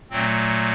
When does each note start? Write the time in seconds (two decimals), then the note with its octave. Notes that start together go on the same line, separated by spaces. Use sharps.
0.10 A#2 F#3 A3 C4